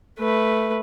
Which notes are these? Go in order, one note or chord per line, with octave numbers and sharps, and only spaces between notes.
A3 B4